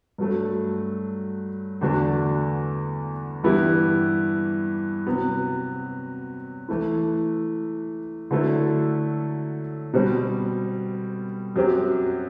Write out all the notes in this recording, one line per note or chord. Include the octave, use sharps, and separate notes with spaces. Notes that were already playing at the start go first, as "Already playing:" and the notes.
G2 F#3 A3
E2 D3 A3 D4 F#4
G2 E3 B3 E4 G4
C3 F#3 B3
E3 A3 E4
D3 F#3 A3 E4 A4
B2 G3 C4
F#2 F#3 C4 G4